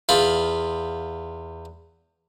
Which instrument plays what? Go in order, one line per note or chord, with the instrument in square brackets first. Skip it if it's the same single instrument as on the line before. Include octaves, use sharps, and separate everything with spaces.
[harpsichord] E2 F4 B5